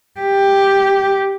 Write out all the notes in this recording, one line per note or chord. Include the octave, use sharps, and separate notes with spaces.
G4